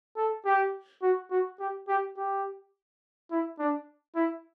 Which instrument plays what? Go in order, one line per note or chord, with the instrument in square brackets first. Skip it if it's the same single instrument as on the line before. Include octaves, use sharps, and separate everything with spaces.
[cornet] A4
G4
F#4
F#4
G4
G4
G4
E4
D4
E4